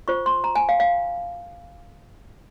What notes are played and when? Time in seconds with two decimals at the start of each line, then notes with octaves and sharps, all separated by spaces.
0.08 F4 C5 C#6
0.26 C6
0.44 A#5
0.55 G#5
0.69 F5
0.80 F5